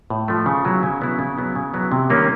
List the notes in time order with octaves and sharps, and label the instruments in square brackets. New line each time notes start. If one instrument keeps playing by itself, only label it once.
[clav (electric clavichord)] A2
F3 A3
C#3
F#3 B3 E4
C#3
F#3 B3 E4
C#3
F#3 B3 E4
C#3
F#3 B3 E4
C3
D#3 G3 A#3 C#4